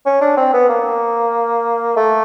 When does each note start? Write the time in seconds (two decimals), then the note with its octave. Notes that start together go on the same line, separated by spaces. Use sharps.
0.06 C#4
0.21 D4
0.37 C4
0.53 B3
0.69 A#3
1.96 A3